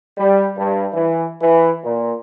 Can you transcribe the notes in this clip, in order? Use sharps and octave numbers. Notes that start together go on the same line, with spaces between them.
G3
G2
E3
E3
A#2